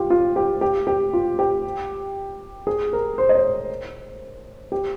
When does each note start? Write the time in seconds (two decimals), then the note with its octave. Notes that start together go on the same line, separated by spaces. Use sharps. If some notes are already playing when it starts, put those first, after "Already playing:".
Already playing: F4 G4
0.10 F4
0.36 G4
0.61 G4
0.87 G4
1.13 F4
1.39 G4
2.67 G#4
2.93 A#4
3.18 C5
3.29 D#5
3.35 C#5
4.72 G4